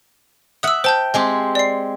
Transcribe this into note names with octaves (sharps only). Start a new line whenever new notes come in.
E5 F#5 D#6 E6
C5 G5 A5 G6
G#3 C4 G4
D5 C7